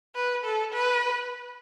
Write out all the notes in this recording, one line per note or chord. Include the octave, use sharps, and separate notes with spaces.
B4
A4
B4